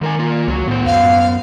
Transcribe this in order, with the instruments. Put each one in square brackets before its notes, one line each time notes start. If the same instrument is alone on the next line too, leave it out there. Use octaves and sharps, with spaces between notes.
[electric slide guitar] G#2 A#4 G#5 [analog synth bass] D#3
[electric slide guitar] A#3 F4
[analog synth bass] C#2 [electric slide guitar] F#3 F#4
[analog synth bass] A2 [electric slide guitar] B3 C5
[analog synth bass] F#2 [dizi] F5